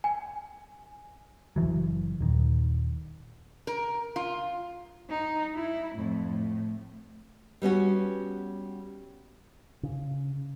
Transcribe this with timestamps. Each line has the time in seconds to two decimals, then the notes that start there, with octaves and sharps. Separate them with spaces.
0.04 G#5
1.56 F#1 E2 E3 F#3
2.21 D#1 D#3
3.67 A#4
4.16 F4
5.10 D#4
5.55 E4
5.95 F2 A2
6.27 A2
7.62 G3 B3 C#4 F#4
9.83 C#3